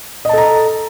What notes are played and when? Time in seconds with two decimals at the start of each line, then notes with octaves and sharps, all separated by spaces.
0.25 D#5
0.29 A5
0.33 A4
0.38 A#5